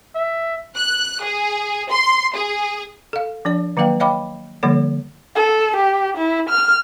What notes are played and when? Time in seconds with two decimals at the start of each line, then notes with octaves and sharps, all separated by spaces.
0.15 E5
0.76 F#6
1.23 G#4
1.90 C6
2.35 G#4
3.13 A4 F5
3.45 F3 D4 D5
3.77 D#3 F#3 A#3 B4 F5 G5
4.00 C#5 D#5 F5 G5 B5 D6
4.63 D3 F3 G3 A#3 A4 C#5
5.36 A4
5.76 G4
6.17 E4
6.49 F6